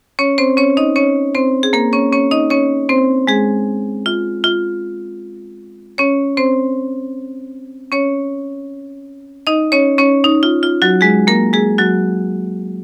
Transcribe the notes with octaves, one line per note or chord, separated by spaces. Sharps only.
C#4 C#5
C4 C5
C#4 C#5
D#4 D#5
C#4 C#5
C4 C5
G#4
A#3 A#4
C#4 C#5
C#4 C#5
D#4 D#5
C#4 C#5
C4 C5
G#3 G#4
F4
F4
C#4 C#5
C4 C5
C#4 C#5
D#4 D#5
C#4 C#5
C#4 C#5
D#4
F4
F4
F#3 F#4
G#3 G#4
A#3 A#4
G#3 G#4
F#3 F#4